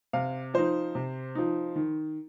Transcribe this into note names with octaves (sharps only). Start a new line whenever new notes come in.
C3 F5
F3 D#4 C5
C3
F3 D#4
D#3